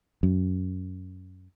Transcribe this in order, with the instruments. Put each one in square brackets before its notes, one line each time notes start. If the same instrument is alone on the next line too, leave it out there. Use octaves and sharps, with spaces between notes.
[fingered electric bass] F#2